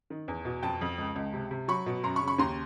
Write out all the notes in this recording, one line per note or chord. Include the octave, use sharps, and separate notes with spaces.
D#3
E2
B2
F2 G5 A5
F2
C#2
C#2
C3
C3
F#3 B5 C#6
B2
F#2 A#5 C6
B5 C#6
C#3
B5 C#6
D#2 A#5 C6